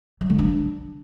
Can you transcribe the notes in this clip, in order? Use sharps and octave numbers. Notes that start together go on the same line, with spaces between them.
F#3
D3
D4